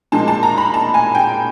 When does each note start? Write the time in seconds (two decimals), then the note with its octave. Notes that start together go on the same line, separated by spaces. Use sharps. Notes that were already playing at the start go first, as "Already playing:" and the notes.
0.12 A#2 F3 G#3 A5
0.28 A5
0.43 A#5
0.58 B5
0.74 A5
0.94 G#5
1.15 G5